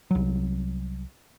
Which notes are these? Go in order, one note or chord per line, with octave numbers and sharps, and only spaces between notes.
C2 F#3